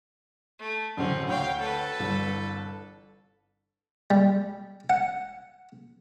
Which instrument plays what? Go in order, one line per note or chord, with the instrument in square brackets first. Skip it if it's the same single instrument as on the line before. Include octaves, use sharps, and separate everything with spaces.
[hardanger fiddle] A3
[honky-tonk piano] A1 F#2 D3 [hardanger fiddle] C4 C#4
[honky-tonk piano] D2 C#5 [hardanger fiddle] F5 G5
[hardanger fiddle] A4 B4
[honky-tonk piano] G1 C2 E3
[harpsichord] G3
F#5